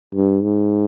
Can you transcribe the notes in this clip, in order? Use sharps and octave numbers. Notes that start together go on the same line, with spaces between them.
G2
G#2